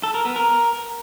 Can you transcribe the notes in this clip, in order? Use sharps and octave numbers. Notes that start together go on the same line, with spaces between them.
A4
A#4
B3
A#4